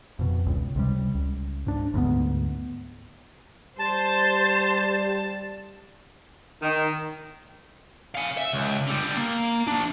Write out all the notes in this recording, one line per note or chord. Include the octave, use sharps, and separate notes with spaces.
F2 B2
C#2
C#2 C3 G3
C#2
G#2 D4
D2 G#2 B3
G3 C5 A5
D#3
F5 G#5
E5
C#2
D3 G3
A#3
F3 D4